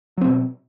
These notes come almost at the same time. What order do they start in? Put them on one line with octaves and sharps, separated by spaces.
F#3 C4 B2